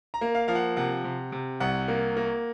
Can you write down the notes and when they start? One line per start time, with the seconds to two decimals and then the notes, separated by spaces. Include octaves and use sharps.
0.14 A#5
0.21 A#3
0.35 F5
0.48 F3 F5
0.55 F#5
0.77 C3 F#5
1.04 C3
1.32 C3
1.60 C2 F#5
1.88 A#3
2.17 A#3